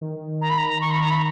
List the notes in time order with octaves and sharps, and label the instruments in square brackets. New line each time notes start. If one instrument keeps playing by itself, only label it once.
[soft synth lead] D#3
[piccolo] A#5
B5
A#5
C#6
B5
A#5
B5